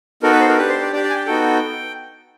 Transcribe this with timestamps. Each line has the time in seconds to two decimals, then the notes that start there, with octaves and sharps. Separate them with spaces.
0.23 B3 D#4 F#4 A4 A#4
0.32 B4
0.40 C5
0.49 A#4
0.57 D4 G4 B4
0.69 C5
0.81 D5
0.93 D4 D5
0.95 G4
1.04 D5
1.10 G#5
1.16 G5
1.26 B3 D#4 F#4 A4 G5